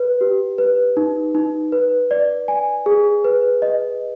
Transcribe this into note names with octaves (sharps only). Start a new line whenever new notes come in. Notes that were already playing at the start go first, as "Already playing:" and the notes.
Already playing: B4
G4
B4
D#4
D#4
B4
D5
G#5
G#4
B4
D#5